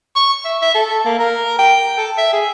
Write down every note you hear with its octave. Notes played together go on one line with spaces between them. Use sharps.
C#6
E5
E5
A4
A#3
A#4
G5
A4
E5
G#4